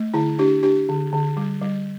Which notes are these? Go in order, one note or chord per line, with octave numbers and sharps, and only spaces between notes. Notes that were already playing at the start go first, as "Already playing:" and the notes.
Already playing: A3
D3 E4
D4 G4
D4 G4
D3
D3
G3
G3